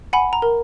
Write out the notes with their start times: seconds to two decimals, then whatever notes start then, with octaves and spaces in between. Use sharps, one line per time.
0.13 F#5 G#5 B5
0.33 A#5
0.42 A#4